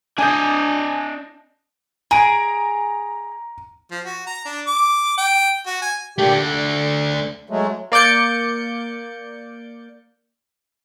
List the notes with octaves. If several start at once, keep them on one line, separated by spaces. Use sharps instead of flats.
D4 D#5 G#5 G6
G#4 A#5 D7
F3
F#4
A#5
D4
D6
G5
F#4
G#5
A#2 A3 D4 G4
D3
F#3 G#3 A3
A#3 D5 D6 G6 C#7